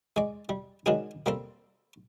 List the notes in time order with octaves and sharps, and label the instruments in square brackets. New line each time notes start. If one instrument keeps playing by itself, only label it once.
[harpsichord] G#3 D5
G3
D#3 F#3 G#3 D4 G#4
G3 A#3 C4 A4